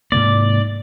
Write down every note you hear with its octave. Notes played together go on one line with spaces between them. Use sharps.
G#2 C3 A#3 D5